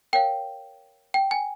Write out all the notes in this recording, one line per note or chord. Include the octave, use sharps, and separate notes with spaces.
A#4 C#5 F5 G5
G5
G#5